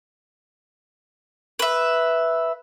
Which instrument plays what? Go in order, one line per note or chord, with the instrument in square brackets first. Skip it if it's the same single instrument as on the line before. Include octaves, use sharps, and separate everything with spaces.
[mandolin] B4 E5